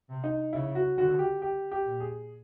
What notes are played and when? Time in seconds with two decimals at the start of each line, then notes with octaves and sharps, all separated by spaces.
0.09 C3
0.24 D#4
0.53 C#3 E4
0.75 F#4
0.97 D3 F#4
1.19 G4
1.42 G4
1.72 G4
1.85 A#2
2.00 G#4